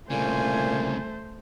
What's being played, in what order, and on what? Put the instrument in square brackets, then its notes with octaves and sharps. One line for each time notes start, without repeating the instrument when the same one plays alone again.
[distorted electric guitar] C2 C#3 [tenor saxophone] A#2 [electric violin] A3 C5 [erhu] G#5